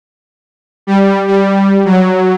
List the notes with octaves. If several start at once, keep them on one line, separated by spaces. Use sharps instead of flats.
G3
G3
F#3